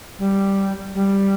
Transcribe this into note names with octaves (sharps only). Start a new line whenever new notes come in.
G3
G3